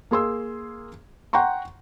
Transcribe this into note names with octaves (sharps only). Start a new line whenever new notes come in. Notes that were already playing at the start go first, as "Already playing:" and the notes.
A#3 G#4 C6 E6
F#5 G5 A#5 C6 C#6